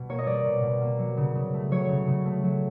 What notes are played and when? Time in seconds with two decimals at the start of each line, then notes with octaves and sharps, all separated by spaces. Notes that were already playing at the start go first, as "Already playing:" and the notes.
Already playing: B2 G3
0.09 A#3 C#5
0.18 D#5
0.26 G3 D5
0.45 B2
0.63 B2
0.82 A#3
0.99 F#3
1.17 C#3
1.35 C#3
1.54 A3
1.71 F#3 C#5
1.89 C#3
2.07 C#3
2.25 A3
2.44 F#3